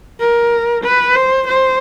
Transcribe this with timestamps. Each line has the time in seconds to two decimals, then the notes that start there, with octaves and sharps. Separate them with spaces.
0.20 A#4
0.84 B4
1.16 C5
1.48 C5